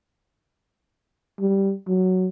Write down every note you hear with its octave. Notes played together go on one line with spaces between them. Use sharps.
G3
F#3